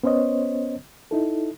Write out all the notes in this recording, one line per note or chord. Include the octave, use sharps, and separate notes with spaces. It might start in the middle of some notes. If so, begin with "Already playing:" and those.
B3 C#4 C5 C#5 D#5
D#4 E4 A4